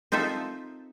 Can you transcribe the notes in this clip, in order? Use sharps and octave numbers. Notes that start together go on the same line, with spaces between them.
C4 D#4 F4 A4 E5